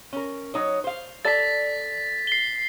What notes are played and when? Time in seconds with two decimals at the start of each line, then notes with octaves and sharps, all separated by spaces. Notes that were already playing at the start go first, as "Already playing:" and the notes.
0.13 C#4 A#4
0.54 F#3 D#4 C#5
0.84 C5 F5
1.25 A4 D5 A5 A6 B6
2.27 C7 G7